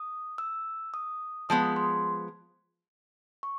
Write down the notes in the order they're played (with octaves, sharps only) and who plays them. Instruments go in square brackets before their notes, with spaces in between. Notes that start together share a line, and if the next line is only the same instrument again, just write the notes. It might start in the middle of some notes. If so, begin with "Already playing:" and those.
Already playing: [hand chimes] D#6
E6
D#6
[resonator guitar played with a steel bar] F3 G#3 B3 [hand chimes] D#6
[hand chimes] C6
C#6